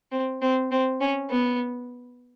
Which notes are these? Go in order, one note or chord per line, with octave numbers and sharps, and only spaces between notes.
C4
C4
C4
C#4
B3